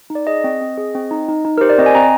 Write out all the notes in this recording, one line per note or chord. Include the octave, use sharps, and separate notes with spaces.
D#4
D5
G#4 D#5
C4
C4
G#4
C4
D#4
D#4
D#4
A#4
G4 C5
D5
C4 D#5
G#5
C4 A#5